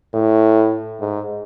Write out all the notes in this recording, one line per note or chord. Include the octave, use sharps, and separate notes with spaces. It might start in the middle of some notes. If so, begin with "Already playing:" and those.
A2
G#2